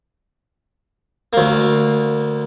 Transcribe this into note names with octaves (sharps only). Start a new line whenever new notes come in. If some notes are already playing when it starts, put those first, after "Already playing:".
D2 A#3